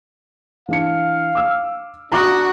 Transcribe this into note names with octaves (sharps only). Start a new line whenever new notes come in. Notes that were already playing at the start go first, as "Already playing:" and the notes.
E3 D4 F5 C#7
D6 E6 F6
D4 F#4 F#5 A#5 D6 D#6